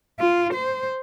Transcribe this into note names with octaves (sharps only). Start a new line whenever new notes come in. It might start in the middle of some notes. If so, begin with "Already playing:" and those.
F4
C5